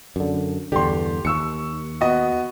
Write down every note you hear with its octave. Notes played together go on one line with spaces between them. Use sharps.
F#2 D3
E2 G2 D3 G4 C6
D#2 C#6 E6 C#7
B3 F#4 D#5